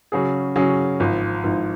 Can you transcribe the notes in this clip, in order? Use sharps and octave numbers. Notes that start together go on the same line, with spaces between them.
C#3 F#3 C#4 G#4
C#3 F#3 C#4 G#4
G#1 G#2 F3
G#1 G#2 F3